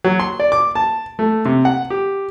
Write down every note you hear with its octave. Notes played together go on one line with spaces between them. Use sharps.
F#3
C6
D5
D6
A5
A3
C3
F#5
G4